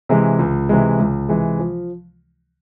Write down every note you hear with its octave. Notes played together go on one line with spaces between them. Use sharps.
C3 E3 G#3
C#2
C3 E3 G#3
C#2
C3 E3 G#3
F3